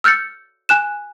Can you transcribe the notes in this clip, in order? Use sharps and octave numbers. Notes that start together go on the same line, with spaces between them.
E6 F6 G6 A6 C#7
G#5 F#6 E7